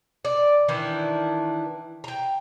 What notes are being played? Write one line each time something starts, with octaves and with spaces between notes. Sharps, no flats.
D5
D#3 E3 D4 E4
G5 A#5